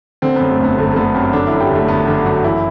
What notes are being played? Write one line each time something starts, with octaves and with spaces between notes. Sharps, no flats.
D3 C4
F#2 B3
A3
G1 B3
G1 A3
A3
D3 B3
F#2 C4
D3 D4
F#2 E4
G4
G1 A3
G1 B3
D3 D4
F#2 F#4
E3 E4